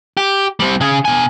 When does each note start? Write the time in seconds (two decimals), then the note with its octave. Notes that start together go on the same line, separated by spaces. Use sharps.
0.17 G4
0.60 G3 C4
0.81 C#3 G#4
1.05 B2 G#5